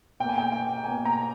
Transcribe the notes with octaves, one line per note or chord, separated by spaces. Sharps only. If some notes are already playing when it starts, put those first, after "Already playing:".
B2 A#3 G5
G#5
G5
G5
B2 A#3 G#5
A#5